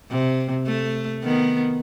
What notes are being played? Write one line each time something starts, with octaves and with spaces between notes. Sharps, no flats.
C3
A3
D#3 B3